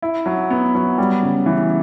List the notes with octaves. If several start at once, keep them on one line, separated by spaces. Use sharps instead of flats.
E4
F#3
B3
F#3
G3
C#3
E3